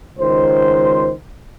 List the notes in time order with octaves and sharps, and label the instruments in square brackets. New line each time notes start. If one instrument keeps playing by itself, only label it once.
[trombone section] C#2 D#3 C5